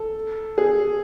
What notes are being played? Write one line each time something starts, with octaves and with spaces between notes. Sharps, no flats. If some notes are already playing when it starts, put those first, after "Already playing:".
Already playing: A4
G#4